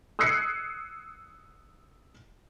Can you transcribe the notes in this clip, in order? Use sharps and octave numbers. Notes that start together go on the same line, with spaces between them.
D#6 E6 F#6 G#6 C7 C#7